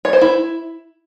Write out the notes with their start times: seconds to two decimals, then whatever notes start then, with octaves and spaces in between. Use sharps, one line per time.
0.05 C#5
0.13 C5
0.21 E4